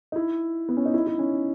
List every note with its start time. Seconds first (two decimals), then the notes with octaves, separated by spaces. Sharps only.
0.12 D#4
0.16 E4
0.69 B3
0.77 C#4
0.86 D#4
0.94 E4
1.00 D#4
1.07 E4
1.19 C#4